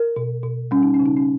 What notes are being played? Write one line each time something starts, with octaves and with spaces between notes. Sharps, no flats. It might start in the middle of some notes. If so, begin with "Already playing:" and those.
Already playing: A#4
B2
B2
G3 C#4
D#4
C#4
C#3
D#4
C#4